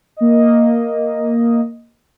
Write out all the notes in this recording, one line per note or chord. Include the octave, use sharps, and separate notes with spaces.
A#3 D#5